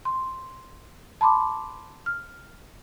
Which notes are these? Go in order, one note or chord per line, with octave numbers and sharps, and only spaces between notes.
C6
A5 B5 C6 D6
F6